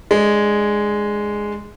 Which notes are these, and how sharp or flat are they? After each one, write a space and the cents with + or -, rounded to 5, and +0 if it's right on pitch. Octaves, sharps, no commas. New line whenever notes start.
G#3 +0 D4 +10